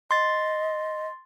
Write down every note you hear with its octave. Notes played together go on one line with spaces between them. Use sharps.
D#5 C6 A6